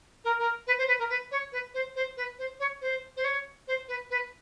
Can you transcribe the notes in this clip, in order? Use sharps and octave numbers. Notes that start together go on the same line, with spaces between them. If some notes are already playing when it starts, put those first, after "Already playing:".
A#4
A#4
B4
C5
B4
A#4
B4
C#5
B4
C5
C5
B4
C5
C#5
C5
C5
C#5
C5
B4
B4